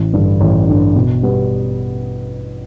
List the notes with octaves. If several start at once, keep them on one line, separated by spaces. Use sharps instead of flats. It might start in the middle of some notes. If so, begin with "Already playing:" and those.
Already playing: A1
G2 D3
A1
G2 D3
B2
G3 B3